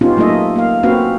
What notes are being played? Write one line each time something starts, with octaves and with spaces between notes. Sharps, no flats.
B3 C#4 D#4 F4 G4
F#3 A3 A#3 D#4 D#5 E5
A#3 F5
A#3 C4 C#4 F#4 B4 F5